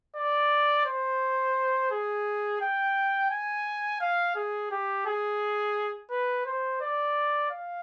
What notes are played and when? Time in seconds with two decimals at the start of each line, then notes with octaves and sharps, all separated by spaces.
0.16 D5
0.86 C5
1.91 G#4
2.61 G5
3.31 G#5
4.00 F5
4.36 G#4
4.71 G4
5.06 G#4
6.11 B4
6.46 C5
6.81 D5
7.51 F5